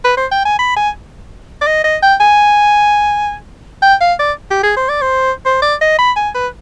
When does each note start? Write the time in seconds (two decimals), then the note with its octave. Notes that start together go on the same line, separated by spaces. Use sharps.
0.05 B4
0.17 C5
0.31 G5
0.45 G#5
0.59 B5
0.76 G#5
1.61 D5
1.67 D#5
1.84 D#5
2.03 G5
2.21 G#5
3.82 G5
4.01 F5
4.19 D5
4.51 G4
4.63 G#4
4.77 C5
4.89 D5
5.02 C5
5.45 C5
5.62 D5
5.81 D#5
5.99 B5
6.16 G#5
6.35 B4